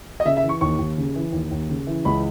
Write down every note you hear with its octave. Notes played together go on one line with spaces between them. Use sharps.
D#5
C#3 E5
E5
E3
C#6
D#2 C#6
D#2
C#3
E3
D#2
D#2
C#3
E3
C#2 B5